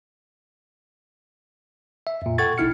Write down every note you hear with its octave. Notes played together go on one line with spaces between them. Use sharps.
E5
F2 A#2
A4 F#5 G5 C#6 G#6 A6
A#1 B2 D#4 E4 F6 C#7